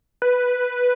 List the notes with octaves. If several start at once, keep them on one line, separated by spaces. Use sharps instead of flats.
B4